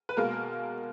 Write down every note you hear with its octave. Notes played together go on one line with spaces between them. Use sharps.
B4
B2 G#3 A#3 A#4